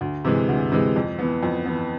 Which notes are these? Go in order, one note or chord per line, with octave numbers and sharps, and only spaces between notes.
D2
C3 E3 G#3
D2
C3 E3 G#3
F2
E3 B3
F2
E3 B3